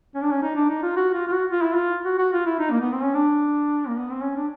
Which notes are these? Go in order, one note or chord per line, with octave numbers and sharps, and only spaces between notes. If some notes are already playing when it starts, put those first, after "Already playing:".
C#4
D4
C#4
D#4
D4
D#4
F4
F#4
F4
F4
F#4
F4
E4
F4
F#4
F#4
F4
E4
D#4
A#3
B3
C4
C#4
D4
A#3
B3
C4
C#4
D4